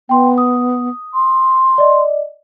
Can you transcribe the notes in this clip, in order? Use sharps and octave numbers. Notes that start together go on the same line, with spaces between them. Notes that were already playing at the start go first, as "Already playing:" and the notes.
B3 G5 C6
D#6
C6
D5 D#5